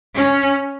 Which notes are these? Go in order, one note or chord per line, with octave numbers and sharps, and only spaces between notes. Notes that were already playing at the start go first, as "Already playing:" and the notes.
C#4